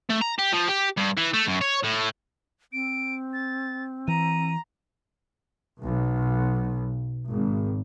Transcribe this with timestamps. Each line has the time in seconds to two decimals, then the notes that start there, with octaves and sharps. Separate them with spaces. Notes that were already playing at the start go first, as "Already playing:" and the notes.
0.09 A3
0.21 A#5
0.39 G4
0.53 F3
0.68 G4
0.98 G2
1.17 E3
1.34 A3
1.47 F#2
1.61 C#5
1.83 A2
2.73 C4 D7
3.33 A6
4.08 E3 A#5 D#7
5.82 B1
7.27 G#1